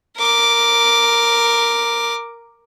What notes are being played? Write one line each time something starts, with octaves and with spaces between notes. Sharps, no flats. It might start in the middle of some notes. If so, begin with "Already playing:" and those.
A#4 D6